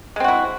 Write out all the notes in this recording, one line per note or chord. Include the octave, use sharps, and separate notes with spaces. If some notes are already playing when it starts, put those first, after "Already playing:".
G#3 C4 E4 F#4